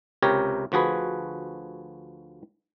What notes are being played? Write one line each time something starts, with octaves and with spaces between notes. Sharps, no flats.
C#2 C3 G4 A#4 C#5
D2 F3 F#4 G#4 B4